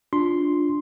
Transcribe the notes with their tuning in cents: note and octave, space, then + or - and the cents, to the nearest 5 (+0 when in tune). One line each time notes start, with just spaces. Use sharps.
D4 +0 F4 +10 C6 +0